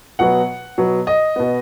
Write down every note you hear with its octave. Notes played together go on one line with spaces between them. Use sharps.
B2 F#3 B3 F#5
B2 F#3 B3
D#5
B2 B3